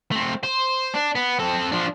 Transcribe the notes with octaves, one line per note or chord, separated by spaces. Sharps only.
A3 C4
C5
D4
B3
C4 A4
F3 D4